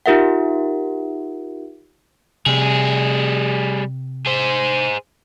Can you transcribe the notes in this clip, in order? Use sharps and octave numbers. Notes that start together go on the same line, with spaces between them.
D#4 F4 G4 A#4 E5 F#5
C3 G3 G#4
G#4 C5